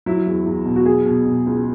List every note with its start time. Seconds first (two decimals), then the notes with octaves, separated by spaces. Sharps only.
0.06 F#3 E4
0.26 E2
0.46 E2
0.65 B2
0.76 F#4
0.86 F#3 G#4
1.06 B2
1.26 B2
1.46 C#2